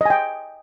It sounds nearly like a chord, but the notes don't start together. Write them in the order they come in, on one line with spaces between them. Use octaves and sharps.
D#5 G#5 G5